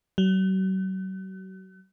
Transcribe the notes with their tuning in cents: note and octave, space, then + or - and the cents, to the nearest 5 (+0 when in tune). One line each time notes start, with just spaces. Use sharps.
F#3 +40